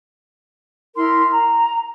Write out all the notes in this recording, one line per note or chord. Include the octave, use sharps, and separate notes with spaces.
E4 A#4 C6
A#5